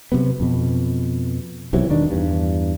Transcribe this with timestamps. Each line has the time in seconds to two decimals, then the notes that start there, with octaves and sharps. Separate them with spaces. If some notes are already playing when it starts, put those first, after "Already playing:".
0.12 C3 F#3 B3
0.40 F2 B2
1.73 B1 C3 E3 F#3
1.89 E1 D#3 D4
2.11 E2 G2